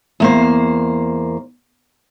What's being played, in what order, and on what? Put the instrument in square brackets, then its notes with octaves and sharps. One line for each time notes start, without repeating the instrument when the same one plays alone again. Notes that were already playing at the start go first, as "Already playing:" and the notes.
[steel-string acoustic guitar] E2 A#3 C5